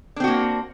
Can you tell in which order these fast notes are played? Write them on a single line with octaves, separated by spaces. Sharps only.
D4 C4 F#4 A#3